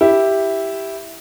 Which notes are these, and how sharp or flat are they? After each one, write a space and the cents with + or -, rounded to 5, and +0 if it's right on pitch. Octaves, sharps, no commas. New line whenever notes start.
E4 +0 G4 +0